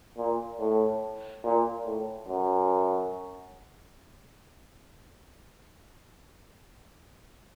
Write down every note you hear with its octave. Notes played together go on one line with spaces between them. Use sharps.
A#2
A2
A#2
A2
F#2